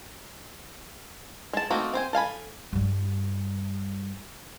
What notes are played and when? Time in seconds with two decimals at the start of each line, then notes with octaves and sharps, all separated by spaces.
1.53 G#3 A5
1.70 A3 A#3 C4 D#4 F#4
1.93 C4 C5 G#5
2.13 A4 F5 G#5 B5
2.73 G2 G3